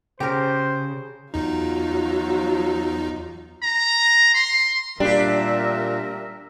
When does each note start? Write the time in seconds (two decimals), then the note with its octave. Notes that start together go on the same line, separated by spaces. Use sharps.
0.20 C#3 G4 A#4 C5
1.34 E2 F#3 D#4 F4
3.62 A#5
4.34 C6
5.00 A#2 G3 D4 G4 A#4 E5